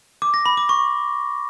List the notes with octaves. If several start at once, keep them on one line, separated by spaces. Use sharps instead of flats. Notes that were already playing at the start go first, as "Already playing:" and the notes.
D6
A#6
B5
D6
C#6